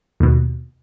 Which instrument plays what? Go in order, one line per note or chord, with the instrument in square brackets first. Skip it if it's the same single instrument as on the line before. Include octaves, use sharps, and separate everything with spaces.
[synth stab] D#2 B2